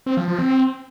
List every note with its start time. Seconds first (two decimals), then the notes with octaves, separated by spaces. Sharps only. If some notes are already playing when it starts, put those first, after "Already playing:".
0.06 C4
0.17 F3
0.28 F3
0.39 C4